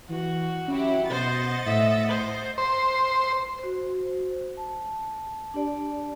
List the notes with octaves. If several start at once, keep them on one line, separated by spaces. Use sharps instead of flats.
E3 F#4
F#3 C#4 E4 G4
B2 C5 D#5 F#5 A6
A2 E5
C5
C5
F#4 C5
A5
D4 G4 D5 A5